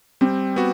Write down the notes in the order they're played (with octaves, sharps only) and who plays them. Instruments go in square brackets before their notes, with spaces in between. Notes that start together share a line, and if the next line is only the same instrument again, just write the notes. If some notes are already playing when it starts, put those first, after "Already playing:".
[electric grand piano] G3 [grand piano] C4
[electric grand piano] B3 F#4